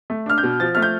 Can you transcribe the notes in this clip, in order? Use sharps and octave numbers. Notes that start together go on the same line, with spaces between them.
A3
D4 F6
G6
B2
F3 A6
A3 F6
G6